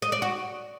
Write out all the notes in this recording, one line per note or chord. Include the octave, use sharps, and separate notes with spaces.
D#5
D5
F#4